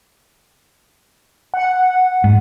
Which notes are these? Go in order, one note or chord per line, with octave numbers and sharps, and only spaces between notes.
F#5
G#2